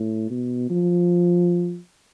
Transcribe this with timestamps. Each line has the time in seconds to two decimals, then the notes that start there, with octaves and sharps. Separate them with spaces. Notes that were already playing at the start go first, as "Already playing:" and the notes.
Already playing: A2
0.30 B2
0.70 F3